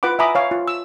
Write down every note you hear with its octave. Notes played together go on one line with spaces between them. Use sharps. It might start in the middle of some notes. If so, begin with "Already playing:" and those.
F4 B4 F#5 B5 D6
E5 G#5 A#5 B5 D6 D#6
C#5 F5
F4
E6